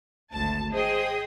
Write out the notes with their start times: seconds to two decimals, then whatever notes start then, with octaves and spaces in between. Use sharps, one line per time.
0.32 G#1 D2 A5
0.73 G#4 C5 D#5 G5 D#6